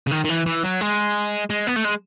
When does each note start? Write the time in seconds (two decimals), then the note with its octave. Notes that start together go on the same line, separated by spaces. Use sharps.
0.07 C#3
0.11 D#3
0.25 D#3
0.29 E3
0.46 E3
0.64 F#3
0.81 G#3
1.50 G#3
1.67 B3
1.76 A3
1.84 G#3